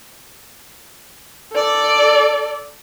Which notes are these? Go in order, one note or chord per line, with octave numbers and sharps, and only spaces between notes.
A4 D5